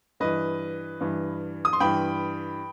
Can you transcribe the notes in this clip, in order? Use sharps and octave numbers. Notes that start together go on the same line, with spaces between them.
G2 E3 B4 D#5
G2 E3
D#6
C6
G2 E3 G5 B5